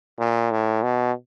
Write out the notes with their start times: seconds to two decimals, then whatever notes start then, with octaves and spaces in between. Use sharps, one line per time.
0.19 A#2
0.51 A2
0.83 B2